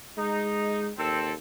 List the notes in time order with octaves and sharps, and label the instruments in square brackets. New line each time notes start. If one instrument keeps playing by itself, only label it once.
[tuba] G#3 [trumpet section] D#4
[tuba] D#2 [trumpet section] C4 A4